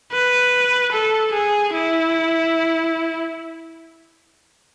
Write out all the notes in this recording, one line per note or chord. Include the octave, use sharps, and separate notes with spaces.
B4
A4
G#4
E4